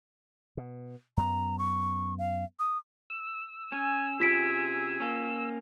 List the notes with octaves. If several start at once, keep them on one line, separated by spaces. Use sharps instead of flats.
B2
F#2 B3 A#5
C#6
F5
D#6
E6
C#4 G#5
C3 C#4 E4 F4 G#4 B6 D7
A#3 C#4